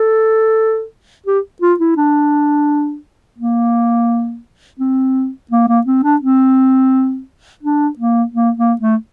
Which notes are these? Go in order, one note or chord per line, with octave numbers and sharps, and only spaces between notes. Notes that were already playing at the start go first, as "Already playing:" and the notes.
Already playing: A4
G4
F4
E4
D4
A#3
C4
A#3
A#3
C4
D4
C4
D4
A#3
A#3
A#3
A3